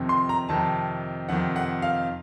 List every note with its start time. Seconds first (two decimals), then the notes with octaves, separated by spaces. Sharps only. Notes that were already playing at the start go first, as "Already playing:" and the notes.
Already playing: F2 C3 D#3
0.09 C6
0.29 A#5
0.49 F2 C3 D#3 A5
1.29 F2 C3 D#3 F#5
1.56 F#5
1.82 F5